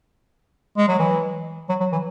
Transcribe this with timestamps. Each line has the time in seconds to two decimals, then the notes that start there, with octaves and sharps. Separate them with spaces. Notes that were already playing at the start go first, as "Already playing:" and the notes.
0.78 G#3
0.88 F#3
0.99 E3
1.69 F#3
1.80 F#3
1.92 E3